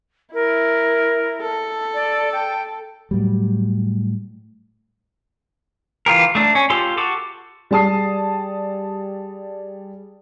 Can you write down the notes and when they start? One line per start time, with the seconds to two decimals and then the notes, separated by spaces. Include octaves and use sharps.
0.34 E4 A#4
1.42 A4
1.94 D5
2.32 G5
3.11 A2 F#3 G3
6.06 E3 F4 G4 A#4
6.35 A3 D4
6.55 C#4
6.70 F4 G4 A4 C6
6.97 F#4 G4 A4 D6
7.71 G3 G#4 A5 D#6 C7